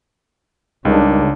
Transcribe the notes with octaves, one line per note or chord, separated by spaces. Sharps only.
C#2 C#3 G3 D4 D#4 A#4